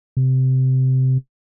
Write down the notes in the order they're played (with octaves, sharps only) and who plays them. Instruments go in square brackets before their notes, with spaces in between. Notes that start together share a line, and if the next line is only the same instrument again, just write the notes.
[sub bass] C3